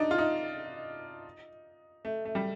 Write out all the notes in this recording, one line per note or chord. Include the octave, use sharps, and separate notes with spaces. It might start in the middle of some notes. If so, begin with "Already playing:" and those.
Already playing: D4 D#4
F4
D#4
A3
A3
G3